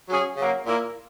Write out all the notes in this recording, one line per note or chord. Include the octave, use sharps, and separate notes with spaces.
F#3 C#4 G#4
C#3 F#3 A#3
A#2 A#3 E4 A#4